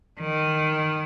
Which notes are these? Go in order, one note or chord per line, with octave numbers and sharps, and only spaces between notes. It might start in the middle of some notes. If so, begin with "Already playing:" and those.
D#3